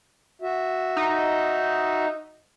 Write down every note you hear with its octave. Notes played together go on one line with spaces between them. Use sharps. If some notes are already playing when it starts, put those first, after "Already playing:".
F#4 E5
D#4